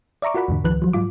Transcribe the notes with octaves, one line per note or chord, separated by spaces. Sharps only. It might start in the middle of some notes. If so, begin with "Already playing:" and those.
D5 E5 A#5 C#6 D6
F4 F#4 A#4 F#5 B5
E2 G#2 D3
C#2 D#3 F3 B4 F#6
F3 F#3
G#2 F#3 F4 D6